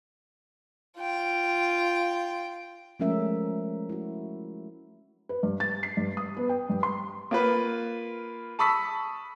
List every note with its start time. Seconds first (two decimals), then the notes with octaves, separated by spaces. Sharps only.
0.98 F4 G5
3.00 F3 G#3 A3 C#4 A#4 E5
3.89 E4 F#4
5.29 B4
5.43 G2
5.60 A6
5.83 C7
5.97 G2
6.17 D#6
6.37 B3
6.49 G5
6.69 G2
6.83 C6
7.31 A#3 F4 B4
8.59 A5 B5 C#6 D#6 E6 B6